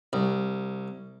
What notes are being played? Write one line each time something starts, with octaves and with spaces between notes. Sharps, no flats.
C2